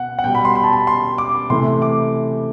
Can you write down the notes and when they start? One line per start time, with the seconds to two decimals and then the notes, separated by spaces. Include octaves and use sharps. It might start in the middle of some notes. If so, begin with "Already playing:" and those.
Already playing: B2 F#5
0.19 F#5
0.24 B2 G3 G5
0.35 B5
0.45 C6
0.55 B5
0.64 A5
0.73 B5
0.87 C6
1.18 D6
1.50 C3 E3 A3 C6
1.82 D6